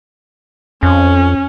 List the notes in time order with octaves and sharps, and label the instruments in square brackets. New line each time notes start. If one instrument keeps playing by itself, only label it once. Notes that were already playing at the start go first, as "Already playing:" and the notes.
[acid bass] F2 [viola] C#4